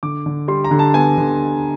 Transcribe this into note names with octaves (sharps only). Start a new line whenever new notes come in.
D3 D6
D3
G3 C6
A#5
D3
A5
B3 G#5
D3